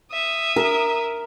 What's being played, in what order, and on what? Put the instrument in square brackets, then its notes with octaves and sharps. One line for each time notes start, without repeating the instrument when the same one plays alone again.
[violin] E5 D#6
[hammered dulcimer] A#4